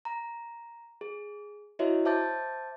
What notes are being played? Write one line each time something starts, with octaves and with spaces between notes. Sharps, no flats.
A#5
G#4
E4 F#4 C#5 D#5 E5
C5 E5 A5 D6 G6 A6